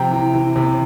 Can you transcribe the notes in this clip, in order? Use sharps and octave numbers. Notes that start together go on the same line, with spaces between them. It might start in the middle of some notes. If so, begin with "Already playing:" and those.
Already playing: C3 F3 G5 A#5
E3
E3
C3